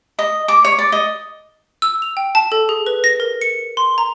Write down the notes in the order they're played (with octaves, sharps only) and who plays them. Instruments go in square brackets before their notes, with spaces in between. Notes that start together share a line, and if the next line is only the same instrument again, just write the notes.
[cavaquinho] D#5
D6
C#5
D5
D#5
[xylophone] E6
F7
G5
A5
A4
G#4
B4
A#6
A#4
C#7
C6
A#5